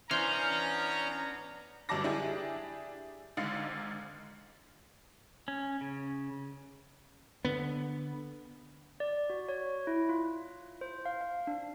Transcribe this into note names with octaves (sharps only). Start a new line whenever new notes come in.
E3 B3 C#4 D4 C5 A#5 F6 G6
G1 F#2 G3 A5 D6 A#6
D4 E4 G4 G#4 G#5
G#1 G#2 D3 F5 A6 C#7
C#4
C#3
D3 B3
D5
F#4
C#5
E4
F4
C5
F5
F5
D4